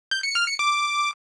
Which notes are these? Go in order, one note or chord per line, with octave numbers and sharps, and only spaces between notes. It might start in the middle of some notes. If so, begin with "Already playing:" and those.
G6
C#7
F6
C#7
D6